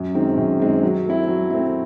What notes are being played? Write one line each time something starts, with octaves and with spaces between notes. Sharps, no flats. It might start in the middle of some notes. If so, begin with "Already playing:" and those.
Already playing: F#2
D#3 G#3 C4
F#2
D#3 G#3 C4
F#3
A3 C4 E4
F#3
A3 C4 E4